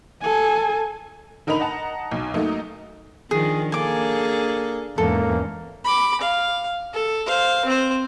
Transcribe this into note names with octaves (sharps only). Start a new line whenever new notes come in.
A4 G#5
D3 D#4 A#4 D#5 B5 F7
D#5 F#5 A5 A#5
B1
F#3 A3 A#3 D#4
D#3 F3 D4 G#4
A#3 D4 G#4 A4 G#5 D6
E2 G#2 A#3 C#4 A4
B5 D6
F5
A4
C5 F5
C4 C5